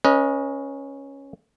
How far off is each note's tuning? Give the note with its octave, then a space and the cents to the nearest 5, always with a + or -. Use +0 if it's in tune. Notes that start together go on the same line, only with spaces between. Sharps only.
C#4 -5 B4 -35 D#5 +0